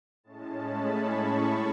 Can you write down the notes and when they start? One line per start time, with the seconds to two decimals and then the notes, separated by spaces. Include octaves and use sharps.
0.24 A2 G#3 C#4 A5
0.56 B5
0.87 C#6
1.19 B5